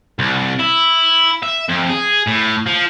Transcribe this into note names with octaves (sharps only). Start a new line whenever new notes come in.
C2
E4
E5
F2
G#4
A2
F3